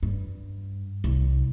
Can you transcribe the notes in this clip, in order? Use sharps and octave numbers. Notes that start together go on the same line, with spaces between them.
G2
C2